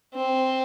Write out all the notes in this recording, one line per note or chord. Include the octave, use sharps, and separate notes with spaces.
C4